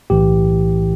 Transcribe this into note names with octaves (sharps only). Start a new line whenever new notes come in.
B1 A2 E3 G4